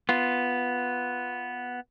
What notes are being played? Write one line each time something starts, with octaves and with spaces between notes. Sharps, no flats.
B3 F4